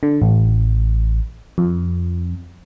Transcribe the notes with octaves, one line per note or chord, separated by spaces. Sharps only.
D3
A1
F2